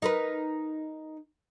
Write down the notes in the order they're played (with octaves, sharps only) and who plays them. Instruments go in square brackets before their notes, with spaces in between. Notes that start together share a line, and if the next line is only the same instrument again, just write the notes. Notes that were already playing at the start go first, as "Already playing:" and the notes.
[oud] D#4 A#4 B4